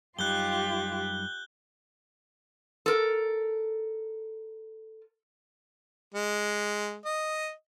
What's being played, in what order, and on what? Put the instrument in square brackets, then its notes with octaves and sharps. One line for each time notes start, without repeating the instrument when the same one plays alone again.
[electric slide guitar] F#2 G3 D#4 [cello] F4 G4 [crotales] F#6 G6 G7
[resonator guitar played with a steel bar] A4 A#4
[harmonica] G#3
D#5